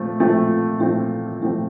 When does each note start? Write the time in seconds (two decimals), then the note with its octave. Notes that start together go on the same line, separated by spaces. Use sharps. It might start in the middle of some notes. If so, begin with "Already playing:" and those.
Already playing: A#2 F3 A3 C4
0.20 A#2 F3 A3 C4
0.79 A#2 F3 A3 C4
1.40 A#2 F3 A3 C4